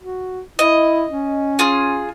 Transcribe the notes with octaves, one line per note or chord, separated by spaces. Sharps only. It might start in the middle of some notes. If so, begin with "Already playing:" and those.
F#4
E4 D#5
C#4
F4 G#4